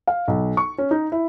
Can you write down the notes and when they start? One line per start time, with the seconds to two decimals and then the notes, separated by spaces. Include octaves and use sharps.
0.07 F5
0.28 B1
0.57 C#6
0.78 C#4
0.91 D#4
1.12 E4